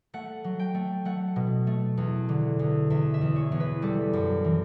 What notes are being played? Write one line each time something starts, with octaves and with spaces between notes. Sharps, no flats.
A3 F#5
F#3
G5
A3
A3 F#5
B2
A3
E2
D3
E2
E2 E5
E5
E2
C#5
E2
B4
G3 A4
F#2
E3